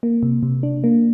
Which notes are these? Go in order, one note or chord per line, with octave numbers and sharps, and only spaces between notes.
A#3
C3
C3
D4
A#3